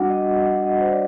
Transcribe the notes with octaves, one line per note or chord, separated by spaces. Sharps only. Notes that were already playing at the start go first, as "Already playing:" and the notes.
Already playing: G3 D4 F#4 F#5
D#5
F#5
D#5
C5
D5